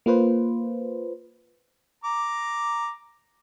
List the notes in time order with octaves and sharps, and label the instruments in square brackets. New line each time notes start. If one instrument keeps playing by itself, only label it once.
[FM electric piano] A#3 F4 B4 C5
[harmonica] A#5 D6